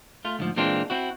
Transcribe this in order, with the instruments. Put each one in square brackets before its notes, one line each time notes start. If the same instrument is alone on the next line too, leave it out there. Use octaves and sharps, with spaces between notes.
[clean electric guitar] A3 F4
D2 G#2 F3
A#2 E3 G#3 C4 D4 F4
C4 E4 F#4